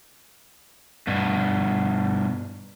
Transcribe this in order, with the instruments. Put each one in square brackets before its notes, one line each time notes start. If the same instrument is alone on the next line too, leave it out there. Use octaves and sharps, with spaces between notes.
[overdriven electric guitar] G2 B2